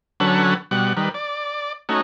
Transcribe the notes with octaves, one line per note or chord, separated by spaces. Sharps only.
D3 F#3 C#4 A4 B4 F#5
B2 G3 F#5
D#3 G3 B4
D5
A3 C#4 D#4 F#4